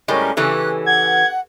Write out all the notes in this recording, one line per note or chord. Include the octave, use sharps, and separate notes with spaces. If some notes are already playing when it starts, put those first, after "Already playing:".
A2 G3 G#3 C#4 A#4
C#3 E3 C#4 G4 A4 B4 F#6
F#5 G#6